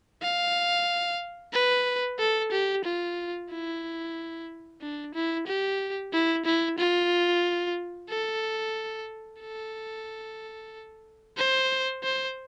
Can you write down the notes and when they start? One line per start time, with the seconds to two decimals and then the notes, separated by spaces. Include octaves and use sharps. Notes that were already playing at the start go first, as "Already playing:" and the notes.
0.22 F5
1.53 B4
2.19 A4
2.52 G4
2.85 F4
3.51 E4
4.81 D4
5.15 E4
5.47 G4
6.13 E4
6.46 E4
6.78 F4
8.10 A4
9.41 A4
11.37 C5
12.04 C5